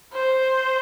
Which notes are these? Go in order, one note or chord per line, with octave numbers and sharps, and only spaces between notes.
C5